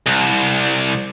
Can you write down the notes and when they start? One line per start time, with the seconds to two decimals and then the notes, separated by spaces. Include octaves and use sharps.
0.06 C2